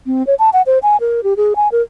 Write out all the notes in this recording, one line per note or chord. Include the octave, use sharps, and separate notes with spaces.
C4
C#5
A5
F#5
C5
G#5
A#4
G4
G#4
G#5
A#4